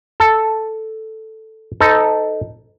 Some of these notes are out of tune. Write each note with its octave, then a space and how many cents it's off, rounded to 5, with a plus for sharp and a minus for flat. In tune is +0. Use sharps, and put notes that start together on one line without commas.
A4 +0 A5 +0
D#4 +0 A4 +0 C5 -45